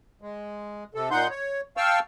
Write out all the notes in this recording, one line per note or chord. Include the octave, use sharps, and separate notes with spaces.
G#3
C3 A4
A#2 D#4 F#5 C6 G6
C#5
F5 G5 A5 C#6 E6 F6